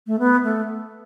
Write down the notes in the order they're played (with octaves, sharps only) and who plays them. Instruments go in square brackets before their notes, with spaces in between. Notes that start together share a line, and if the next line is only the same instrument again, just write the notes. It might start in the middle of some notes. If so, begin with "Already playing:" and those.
[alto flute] A3
B3
A3